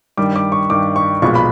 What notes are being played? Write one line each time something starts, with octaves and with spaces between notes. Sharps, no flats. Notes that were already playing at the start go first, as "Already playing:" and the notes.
G2 D#3 G3 D6
D6
C#6
G2 D#3 G3 D6
C#6
B1 A#2 F3 G#3 B3 C#6
B5